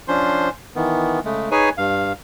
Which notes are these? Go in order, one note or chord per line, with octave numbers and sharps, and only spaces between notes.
F3 C#4 D4 C5 C6
D#3 E3 B3
C#3 G#3 A3
D#4 G#4 B4 C#5 G#5
G2 F5